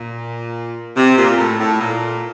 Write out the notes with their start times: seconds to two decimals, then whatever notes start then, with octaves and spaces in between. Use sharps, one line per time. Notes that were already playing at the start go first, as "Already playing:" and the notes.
Already playing: A#2
0.95 C3
1.16 A#2
1.38 A2
1.59 A2
1.80 A#2